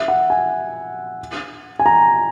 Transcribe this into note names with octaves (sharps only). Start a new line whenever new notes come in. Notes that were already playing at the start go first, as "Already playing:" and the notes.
Already playing: E5
F#5
G#5
G#5
A#5